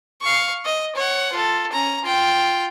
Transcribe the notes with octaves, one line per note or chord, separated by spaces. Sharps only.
F5 C#6
D#5
C#5 F#5
F4 A4
C#4 A#5
F4 G5